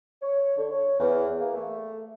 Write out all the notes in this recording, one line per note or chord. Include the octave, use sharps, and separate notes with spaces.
C#5
D3
C#5
E2
A#3
A3